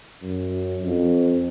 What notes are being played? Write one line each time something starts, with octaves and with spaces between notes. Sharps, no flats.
F#2
F2